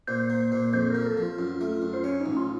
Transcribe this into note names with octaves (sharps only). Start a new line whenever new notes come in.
A#2 C5
A#3
A#2
F2 C5
F3 A#4
A4
F3 F4
F#2
A3
F#2
C5
C#4 C#5
D#4
A1
F4